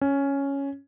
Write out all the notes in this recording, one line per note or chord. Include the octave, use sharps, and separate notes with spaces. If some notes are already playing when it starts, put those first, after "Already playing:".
C#4